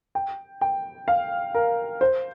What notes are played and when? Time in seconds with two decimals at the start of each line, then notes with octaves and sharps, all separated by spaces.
0.15 G5
0.61 G5
1.08 F5
1.55 A#4
2.01 C5